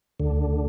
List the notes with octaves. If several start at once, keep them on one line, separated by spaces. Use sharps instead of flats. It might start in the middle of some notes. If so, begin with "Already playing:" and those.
D2 D3